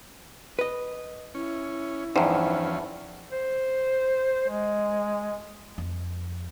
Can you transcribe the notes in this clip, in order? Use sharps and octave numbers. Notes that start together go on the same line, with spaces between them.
B4 D#5
C#4 E4
E2 G2 E3 F3 C#4 D#4 C5
C5
G#3
F2